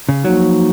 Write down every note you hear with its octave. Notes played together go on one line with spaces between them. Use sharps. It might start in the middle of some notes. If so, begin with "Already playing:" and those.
C#3
F3 F#3 A#3 D#4 F#4